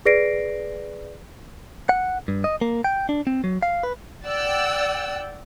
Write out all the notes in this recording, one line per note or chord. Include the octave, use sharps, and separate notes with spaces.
G#4 B4 D5 A#6 C7 D7
F#5
G2
D#5
A#3
G5
D4
C4
F#3
F5
B4
D5 F#5 G5 E6 F#6